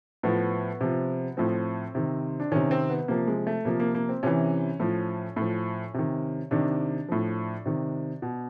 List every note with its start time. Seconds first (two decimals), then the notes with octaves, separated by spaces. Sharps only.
0.23 A2 F3 B3
0.81 C3 F3
1.37 A2 F3 C4
1.95 C3 D#3
2.40 D4
2.52 C3 D#3 C#4
2.71 C4
2.89 B3
3.08 C3 F3 A#3
3.27 G#3
3.47 A3
3.65 C3 F3 A#3
3.80 A#3
3.95 A#3
4.09 C4
4.23 C3 E3 C#4
4.80 A2 F3
5.36 A2
5.42 F3
5.94 C3 D#3
6.51 C3 D#3 D4
7.09 A2 F3
7.66 C3 D#3
8.22 B2